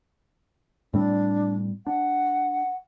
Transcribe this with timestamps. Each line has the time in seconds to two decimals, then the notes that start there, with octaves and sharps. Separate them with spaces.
0.94 A2 G3 C4 D4
1.87 D4 F#5